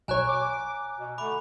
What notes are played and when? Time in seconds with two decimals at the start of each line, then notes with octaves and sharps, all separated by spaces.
0.08 B1 C#5 G#5 A#5 F#6
0.28 D6
0.99 B2
1.18 D3 A3 B5 D6